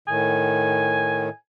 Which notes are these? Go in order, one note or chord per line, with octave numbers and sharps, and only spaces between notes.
A2 D#3 G#5